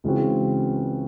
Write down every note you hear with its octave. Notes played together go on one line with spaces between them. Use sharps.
C#2 C#3 E3 C4 F#4